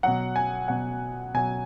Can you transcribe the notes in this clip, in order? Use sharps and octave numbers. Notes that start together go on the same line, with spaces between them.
B2 F#3 F#5
G#5
B2 F#3 F#5
B2 F#3 G#5